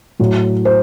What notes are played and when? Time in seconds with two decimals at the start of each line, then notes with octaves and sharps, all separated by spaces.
0.19 A2 F#3
0.65 C5